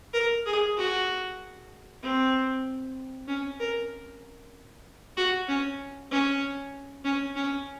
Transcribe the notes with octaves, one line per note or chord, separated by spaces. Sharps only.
A#4
G#4
F#4
C4
C#4
A#4
F#4
C#4
C#4
C#4
C#4